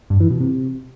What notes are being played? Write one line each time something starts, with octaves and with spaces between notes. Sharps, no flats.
G2
E3
B2
C3